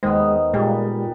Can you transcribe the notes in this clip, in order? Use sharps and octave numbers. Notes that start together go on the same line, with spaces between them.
D#2 D#3 G#3 B3 C5
A#2 G3 G#3 G4 G#5